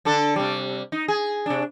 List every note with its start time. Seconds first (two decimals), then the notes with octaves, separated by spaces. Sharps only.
0.05 D3 D4 A4
0.36 C3 G3
0.92 D#4
1.08 G#4
1.46 C3 D4